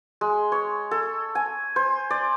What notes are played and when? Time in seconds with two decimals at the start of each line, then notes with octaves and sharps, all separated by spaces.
0.21 G#3
0.52 C#5
0.91 A4
1.35 G#5
1.76 C5
2.10 D5